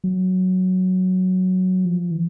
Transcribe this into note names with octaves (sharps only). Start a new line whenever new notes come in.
F#3
F3
E3